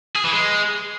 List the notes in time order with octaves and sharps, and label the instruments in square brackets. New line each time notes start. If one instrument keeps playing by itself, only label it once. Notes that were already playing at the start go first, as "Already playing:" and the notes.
[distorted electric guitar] G#4
E3
G#3